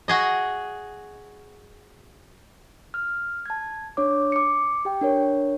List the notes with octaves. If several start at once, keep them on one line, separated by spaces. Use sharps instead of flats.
F#4 G#4 D#5
F6
A5 G#6
D4 C#5 D6
D6 C#7
G4 G5
D4 A#4 C#5